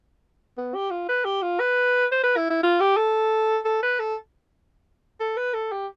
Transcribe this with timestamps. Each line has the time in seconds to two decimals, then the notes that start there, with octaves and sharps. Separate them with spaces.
0.57 B3
0.75 G4
0.91 F4
1.09 B4
1.25 G4
1.42 F4
1.60 B4
2.12 C5
2.23 B4
2.37 E4
2.50 E4
2.63 F4
2.80 G4
2.97 A4
3.65 A4
3.83 B4
4.00 A4
5.20 A4
5.37 B4
5.54 A4
5.72 G4